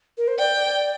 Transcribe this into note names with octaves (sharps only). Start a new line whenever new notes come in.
A#4
C5
D5 G5